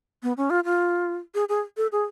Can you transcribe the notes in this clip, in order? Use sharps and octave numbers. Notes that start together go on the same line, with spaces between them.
B3
C#4
F4
F4
G#4
G#4
A4
G#4